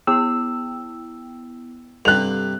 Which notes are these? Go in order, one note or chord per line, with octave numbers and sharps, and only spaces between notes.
B3 E4 G5 E6
G2 C3 A4 F#6 F7